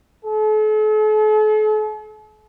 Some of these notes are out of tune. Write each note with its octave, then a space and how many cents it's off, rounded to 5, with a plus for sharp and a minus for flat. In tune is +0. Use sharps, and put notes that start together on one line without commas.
A4 -45